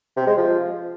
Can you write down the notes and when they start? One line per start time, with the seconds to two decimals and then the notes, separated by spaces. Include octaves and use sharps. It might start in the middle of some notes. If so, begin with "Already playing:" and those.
0.17 C3
0.27 G#3
0.37 F3